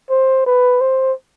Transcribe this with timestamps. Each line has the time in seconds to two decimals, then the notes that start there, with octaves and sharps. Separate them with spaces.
0.10 C5
0.46 B4
0.81 C5